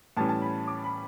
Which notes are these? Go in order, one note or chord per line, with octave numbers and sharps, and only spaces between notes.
A2 E3 G3 C#4 A5
A5
B5
D6
B5